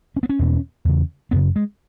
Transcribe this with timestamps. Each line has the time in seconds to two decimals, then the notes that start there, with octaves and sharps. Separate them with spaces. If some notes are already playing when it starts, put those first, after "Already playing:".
0.16 C#4
0.23 B3
0.29 C#4
0.39 E2 B2
0.85 E2 C#3
1.31 F#2 C#3 B3
1.56 G#3